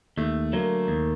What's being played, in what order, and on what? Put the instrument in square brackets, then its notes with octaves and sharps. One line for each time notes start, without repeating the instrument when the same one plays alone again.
[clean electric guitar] D#2 [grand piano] A3
[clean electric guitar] D3 F#3 [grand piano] A#3
[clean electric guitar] D#2